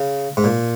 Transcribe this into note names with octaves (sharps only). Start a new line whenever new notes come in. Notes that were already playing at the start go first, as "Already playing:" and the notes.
Already playing: C#3
G#2
A#2